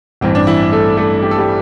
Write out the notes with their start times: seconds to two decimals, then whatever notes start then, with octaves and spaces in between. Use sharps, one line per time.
0.21 A1 G2 E3 C4
0.35 D4
0.47 E3 E4
0.72 A3 A4
0.97 A3 A4
1.22 G4
1.31 A4
1.38 G3 G4